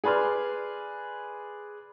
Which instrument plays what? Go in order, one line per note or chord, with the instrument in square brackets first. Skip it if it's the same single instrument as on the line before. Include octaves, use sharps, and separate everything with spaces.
[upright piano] G#4 B4 D5 C6 F6